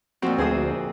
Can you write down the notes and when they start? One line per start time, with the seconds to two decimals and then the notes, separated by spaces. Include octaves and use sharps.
0.22 F2 A#2 C4 F#4
0.38 D2 G#4 C5 D#6